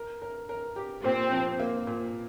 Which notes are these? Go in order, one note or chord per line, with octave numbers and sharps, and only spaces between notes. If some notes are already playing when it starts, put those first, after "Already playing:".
Already playing: A#4
A#4
A#4
G4
A#2 C4
F3
A#3
A#2